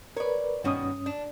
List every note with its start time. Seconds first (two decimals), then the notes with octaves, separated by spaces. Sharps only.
0.17 A#4 B4 C#5 D5
0.64 G2 B2 D#3 C#4 F#4 D#6
1.06 D4